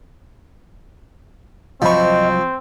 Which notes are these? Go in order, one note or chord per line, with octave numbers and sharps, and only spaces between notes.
C2 F3 F#3 C4 D#5 B5 C#6